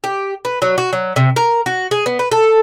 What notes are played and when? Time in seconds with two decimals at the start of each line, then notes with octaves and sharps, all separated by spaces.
0.04 G4
0.45 B4
0.62 F#3
0.78 F#4
0.93 F#3
1.16 C3
1.36 A#4
1.66 F#4
1.91 G#4
2.06 B3
2.19 B4
2.32 A4